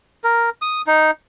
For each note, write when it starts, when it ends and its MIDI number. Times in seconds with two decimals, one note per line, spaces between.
0.24 0.50 70
0.62 0.82 87
0.87 1.11 63